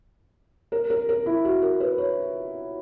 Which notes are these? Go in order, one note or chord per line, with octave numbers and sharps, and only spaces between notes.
A#4
A#4
A#4
E4
F#4
A#4
B4
C#5